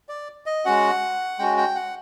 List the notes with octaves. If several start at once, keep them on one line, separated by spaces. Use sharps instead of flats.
D5
D#5
G#3 C#4 F#4 F#5
G#3 C#4 F#4 G5
G5
F#5